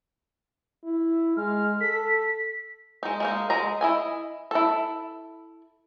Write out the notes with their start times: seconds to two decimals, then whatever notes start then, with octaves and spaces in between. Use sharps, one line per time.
0.84 E4
1.37 G#3 F6
1.81 A4 B6
3.03 G#3 D#4
3.20 G#3 A#3 D#4
3.50 G#3 G#4 A#5
3.81 E4 D#5 G#5
4.51 E4 A4